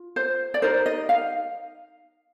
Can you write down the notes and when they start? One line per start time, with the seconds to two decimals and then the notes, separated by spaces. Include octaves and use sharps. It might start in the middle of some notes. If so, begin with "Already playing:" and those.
Already playing: F4
0.16 C5
0.54 D5
0.62 D#4 G4 A#4 C5
0.86 D#5
1.09 F5